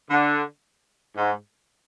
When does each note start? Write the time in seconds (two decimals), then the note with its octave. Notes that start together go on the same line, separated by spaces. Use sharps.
0.10 D3
1.16 G#2